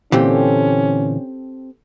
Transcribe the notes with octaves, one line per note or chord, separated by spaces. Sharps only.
A#2 D3 E3 C4 C#4 G4 A4